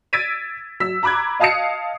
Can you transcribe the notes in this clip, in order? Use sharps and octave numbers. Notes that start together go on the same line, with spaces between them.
E6 G#6 A6 B6 D7 D#7
F#3 E6 B6
A#5 B5 D6 F#6 G#6
D#5 F5 A5 D#6 C7 C#7